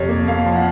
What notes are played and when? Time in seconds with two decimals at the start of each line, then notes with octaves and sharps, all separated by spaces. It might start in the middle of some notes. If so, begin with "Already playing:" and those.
Already playing: F2 C3 C#5
0.09 A#3
0.28 A#3 F5
0.46 F3
0.56 F#5